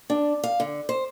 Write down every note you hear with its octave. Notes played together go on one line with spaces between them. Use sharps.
D4
F5
D3
C5